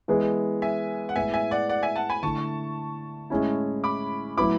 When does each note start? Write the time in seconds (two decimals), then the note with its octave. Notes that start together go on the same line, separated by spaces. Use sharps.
0.08 E3 G#3 B3 E4
0.62 E5 G#5
1.09 F#5
1.16 A2 G#3 B3 E4 E5 G#5
1.34 E5 G#5
1.51 D5 F#5
1.69 D5 F#5
1.83 E5 G#5
1.96 F#5 A5
2.09 G#5 B5
2.23 D3 A3 E4 A5 C#6
3.30 A2 G#3 C#4 E4
3.84 B5 D6
4.37 A2 F#3 B3 E4 B5 D6